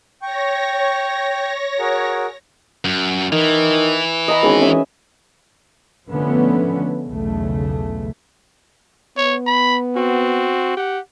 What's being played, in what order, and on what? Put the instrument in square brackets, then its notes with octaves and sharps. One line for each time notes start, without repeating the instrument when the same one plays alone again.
[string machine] C#5 A#6 [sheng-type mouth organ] G5 C#6
[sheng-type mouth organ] F#4 G#4 A#4
[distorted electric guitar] F#2
[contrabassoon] D#3 [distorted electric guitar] E3
[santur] D#5 A#5 B5
[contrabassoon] G#1 [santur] C#4 G#4 B4
[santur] C#4 E5
[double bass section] D3 F3 A3 B3 C#4
B1 E2 C#3 A3
[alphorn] B3 [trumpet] C#5
[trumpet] B5
[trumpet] C4 [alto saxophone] F#4
[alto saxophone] G4 [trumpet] F#5